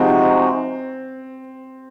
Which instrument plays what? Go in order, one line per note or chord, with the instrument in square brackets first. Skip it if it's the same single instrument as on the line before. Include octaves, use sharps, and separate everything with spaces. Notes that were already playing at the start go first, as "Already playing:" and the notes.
Already playing: [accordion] C3 F3 G#3 D#4 F#4 [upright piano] C4